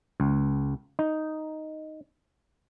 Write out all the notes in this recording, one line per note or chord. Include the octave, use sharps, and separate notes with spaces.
C#2
D#4